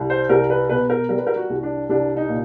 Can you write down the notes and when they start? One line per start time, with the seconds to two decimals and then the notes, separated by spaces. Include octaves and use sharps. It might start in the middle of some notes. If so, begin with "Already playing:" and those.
Already playing: C2
0.10 C5
0.29 C2 A#4
0.50 B4
0.69 B2 B4
0.90 A#4
1.09 G3 A#4
1.18 B4
1.27 A#4
1.36 F#4
1.50 C2
1.63 D4
1.89 C2 D4
2.17 D#4
2.29 A#2